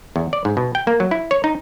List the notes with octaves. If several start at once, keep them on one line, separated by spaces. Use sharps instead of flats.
E2
D5
G#2
B2
G5
A#3
F#3
E4
C#5
D#4